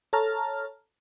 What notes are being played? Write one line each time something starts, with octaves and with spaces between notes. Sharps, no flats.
A4 C#5 A5 A#5 F6